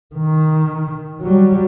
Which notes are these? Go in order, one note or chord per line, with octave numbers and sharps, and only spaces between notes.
D#3
F#3 G3